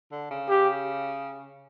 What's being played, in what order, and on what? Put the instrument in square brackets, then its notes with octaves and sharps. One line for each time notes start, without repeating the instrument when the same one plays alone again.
[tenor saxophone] D3
C#3
[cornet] G4